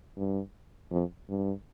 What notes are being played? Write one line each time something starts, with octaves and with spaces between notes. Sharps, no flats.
G2
F2
G2